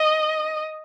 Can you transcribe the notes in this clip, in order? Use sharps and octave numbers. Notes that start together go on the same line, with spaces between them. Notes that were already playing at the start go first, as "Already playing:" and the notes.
Already playing: D#5